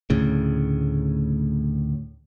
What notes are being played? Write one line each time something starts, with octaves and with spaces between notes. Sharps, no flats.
D2 A2 C#3